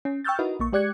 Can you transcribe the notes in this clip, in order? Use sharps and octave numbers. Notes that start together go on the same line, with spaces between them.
C#4
G5 C#6 E6 F6 G6 A6
D#4 E4 F#4 A#4 B4 D#5
A#1 A#3 C#6
G#3 G4 D5 F#6 G#6 C#7